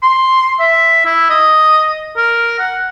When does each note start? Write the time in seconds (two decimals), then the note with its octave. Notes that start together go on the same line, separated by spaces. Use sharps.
0.02 C6
0.59 E5
1.05 E4
1.30 D#5
2.17 A#4
2.59 F#5